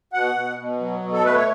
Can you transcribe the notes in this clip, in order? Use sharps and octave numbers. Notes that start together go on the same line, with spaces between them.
B2 F#5
B2
B2
F#3
B2
A4
A3 B4
C#5